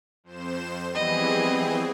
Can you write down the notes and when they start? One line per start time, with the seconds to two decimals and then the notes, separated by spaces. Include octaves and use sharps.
0.24 F2 C5 E7
0.95 E3 F3 G3 B3 C4 G#4 D#5